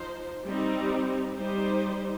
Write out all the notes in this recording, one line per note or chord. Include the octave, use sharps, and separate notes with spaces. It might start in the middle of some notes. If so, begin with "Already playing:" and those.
Already playing: F3 D#4 C5
G3 C4 D#4
G3 D#4 C5